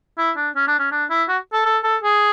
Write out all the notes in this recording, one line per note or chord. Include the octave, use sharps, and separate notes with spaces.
E4
D4
C#4
D4
C#4
D4
E4
F#4
A4
A4
A4
G#4